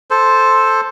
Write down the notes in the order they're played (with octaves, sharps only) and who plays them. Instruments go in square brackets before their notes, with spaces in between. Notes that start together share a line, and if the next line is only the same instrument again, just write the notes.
[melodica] A4 C5